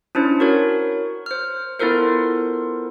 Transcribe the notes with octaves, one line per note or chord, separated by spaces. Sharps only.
C#4 D4 E4 C5
F#4 A#4 C#5
C5 F6
B3 E4 F4 A4 A#4 C5